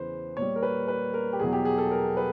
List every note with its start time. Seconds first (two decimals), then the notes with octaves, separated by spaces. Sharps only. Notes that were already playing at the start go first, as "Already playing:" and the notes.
Already playing: E2 C#3 E3 B4 C5
0.37 A#2 G3 C#5
0.56 A#4
0.63 B4
0.88 B4
1.14 A#4
1.33 G4
1.40 E2 B2 F#3 G#4
1.53 G4
1.65 G#4
1.78 A4
1.91 A#4
2.17 B4